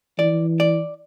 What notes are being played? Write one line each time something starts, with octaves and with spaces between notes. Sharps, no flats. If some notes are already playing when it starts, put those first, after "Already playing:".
E3 D5
D5